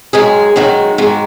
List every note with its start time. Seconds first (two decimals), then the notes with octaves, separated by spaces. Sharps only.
0.13 F#2 D#3 G#3 G#4
0.56 F#2 D#3 G#3 F#4
0.98 G#2 D#3 G#3